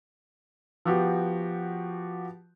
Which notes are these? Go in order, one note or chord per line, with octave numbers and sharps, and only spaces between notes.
F3 B3 F#4 G4